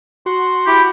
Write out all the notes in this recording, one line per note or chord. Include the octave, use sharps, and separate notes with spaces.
F#4 C6
E4 G4